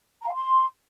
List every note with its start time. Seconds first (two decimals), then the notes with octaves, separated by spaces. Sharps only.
0.21 A#5
0.28 F5
0.34 C6